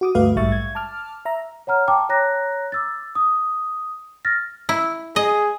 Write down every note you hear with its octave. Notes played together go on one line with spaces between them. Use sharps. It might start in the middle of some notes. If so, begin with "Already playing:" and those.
F#4 D6 D#6
D2 G2 A3 F#4 B4 F5
A#1 G#2 G3 E5 C#6 A6
G#6
A5 D6 F6
E5 A#5
C#5 F#5 A#5 F6
G5 A5 A#5 D6
C#5 A#5 F#6 A#6
D6 E6 A6
D#6
F6 A6 A#6
E4
G#4 D#5